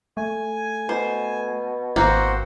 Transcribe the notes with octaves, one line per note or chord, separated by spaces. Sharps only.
A3 G#5
B2 C5
G#1 A#3 C4 F#4 C5 F#5